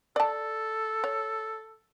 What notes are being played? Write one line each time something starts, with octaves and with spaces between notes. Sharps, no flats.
A4 D5 A5
C#5